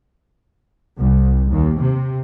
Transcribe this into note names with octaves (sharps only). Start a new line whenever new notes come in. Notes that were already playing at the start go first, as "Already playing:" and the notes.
C2
D#2
C3